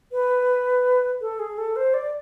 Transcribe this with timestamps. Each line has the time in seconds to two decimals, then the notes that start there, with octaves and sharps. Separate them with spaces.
0.12 B4
1.21 A4
1.39 G#4
1.58 A4
1.76 C5
1.94 D5